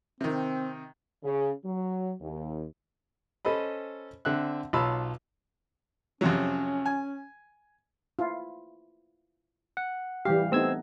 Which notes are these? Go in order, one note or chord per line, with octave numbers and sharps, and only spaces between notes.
C3 D#3 C4
C#3
F#3
D#2
C#4 A4 C5 D#5 B5
D3 C4 E5 F#6
B1 F4 C#5 A5 B5 E6
F2 C3 F#3 C#4
G#5
E4 F4
F#5
E3 G3 G4 F5
A3 B3 C4 D#4 E6 G#6